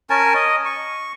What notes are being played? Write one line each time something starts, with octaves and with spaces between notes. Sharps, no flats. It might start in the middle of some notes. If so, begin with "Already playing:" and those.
C#4 A#4 G#5 A5
D#5
C#6